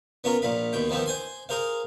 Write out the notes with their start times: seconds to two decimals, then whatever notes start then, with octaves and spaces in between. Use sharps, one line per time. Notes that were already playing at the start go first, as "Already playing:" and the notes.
0.24 B3 C#4 F4 A#4
0.42 A#1 A#2 F5 B5
0.73 D#2 B2 G5
0.89 D#3 F3 B3 C4
1.06 C5 G#5 C6
1.49 G#4 A#4 C5 F5